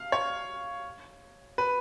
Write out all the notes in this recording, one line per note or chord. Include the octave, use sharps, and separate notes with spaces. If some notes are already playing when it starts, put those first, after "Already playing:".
Already playing: F5
C#5
B4